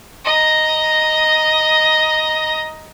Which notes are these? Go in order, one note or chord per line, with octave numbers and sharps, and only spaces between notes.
D#5 A#5